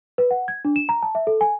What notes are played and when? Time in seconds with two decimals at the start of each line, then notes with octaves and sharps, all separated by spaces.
0.18 B4
0.31 F#5
0.48 G#6
0.65 D4
0.76 E7
0.89 A#5
1.03 A5
1.15 E5
1.27 A4
1.41 G#5